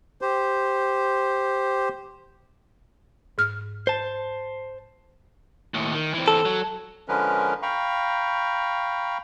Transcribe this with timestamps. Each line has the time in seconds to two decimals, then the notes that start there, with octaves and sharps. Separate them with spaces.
0.21 G4 C5
3.38 G#2 F6
3.87 C5 A5
5.74 D#2 A2
5.94 D#3
6.14 E3 C4
6.28 A4
6.45 F#3
7.08 D3 F3 G#3 C#4 A#4 B4
7.62 F5 G5 A#5 B5 C#6